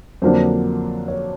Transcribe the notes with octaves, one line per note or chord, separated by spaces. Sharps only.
F2 D3 F#3 A#3 D4 C5
C#5